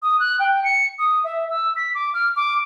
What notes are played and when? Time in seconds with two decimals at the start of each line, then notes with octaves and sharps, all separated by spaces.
0.02 D#6
0.20 F#6
0.40 G5
0.64 C#7
0.99 D#6
1.24 E5
1.50 E6
1.76 B6
1.94 D6
2.14 F6
2.36 D6